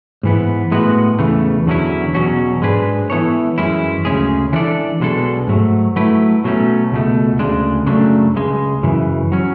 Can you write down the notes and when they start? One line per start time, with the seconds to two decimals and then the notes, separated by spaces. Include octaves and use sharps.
0.23 G#2 E3 B3
0.71 A2 G#3 B3 F#4 B4
1.19 E2 C#3 E3 A3
1.66 E2 D3 F#3 C#4 E4
2.14 E2 B2 F#3 C#4 F#4
2.62 G#2 G#3 D4 G#4 B4
3.10 E3 B3 E4 A4 C#5
3.58 F#2 E3 G#3 C#4 E4
4.05 D2 C#3 G#3 C#4 G#4
4.53 E3 B3 D4 A4 D5
5.00 B1 B2 G#3 D4 A4
5.48 G#2 F#3 A3
5.96 F#3 A3 E4 B4
6.44 B2 F#3 A3 C#4
6.92 C#2 B2 A3
7.39 D2 C#3 G#3 D4
7.87 F#2 C#3 F#3 A3 D4
8.35 C#2 C#3 G#3
8.83 F#2 C#3 E3
9.32 F#3 C#4